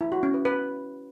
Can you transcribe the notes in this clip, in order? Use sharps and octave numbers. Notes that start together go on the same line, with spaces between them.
E4
F#4
C#4
B4
B4